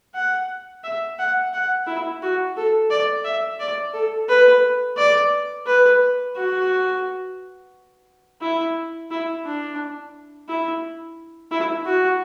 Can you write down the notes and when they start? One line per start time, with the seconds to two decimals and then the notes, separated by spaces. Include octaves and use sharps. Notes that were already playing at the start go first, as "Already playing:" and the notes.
0.15 F#5
0.84 E5
1.19 F#5
1.53 F#5
1.87 E4
2.22 F#4
2.57 A4
2.90 D5
3.25 E5
3.60 D5
3.93 A4
4.29 B4
4.97 D5
5.67 B4
6.36 F#4
8.42 E4
9.11 E4
9.46 D4
10.49 E4
11.51 E4
11.86 F#4